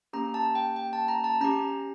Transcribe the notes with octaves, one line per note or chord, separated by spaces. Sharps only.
A#3 C#4 G4 A#5
A5
G5
G5
A5
A#5
A5
C#4 G4 A#5